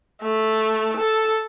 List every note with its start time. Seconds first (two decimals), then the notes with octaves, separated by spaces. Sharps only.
0.22 A3
0.97 A4